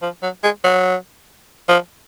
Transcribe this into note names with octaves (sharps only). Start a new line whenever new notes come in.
F3
F#3
G#3
F#3
F3